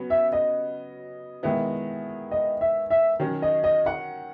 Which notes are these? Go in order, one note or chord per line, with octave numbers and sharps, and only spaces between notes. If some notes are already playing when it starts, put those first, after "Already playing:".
Already playing: C#3 F#3 B3 F#4
E5
D#5
D#3 G#3 B3 E4
D#5
E5
E5
D#3 F#3 C#4
D#5
D#5
F#5